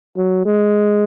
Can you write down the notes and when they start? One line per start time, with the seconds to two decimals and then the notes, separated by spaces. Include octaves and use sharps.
0.17 F#3
0.45 G#3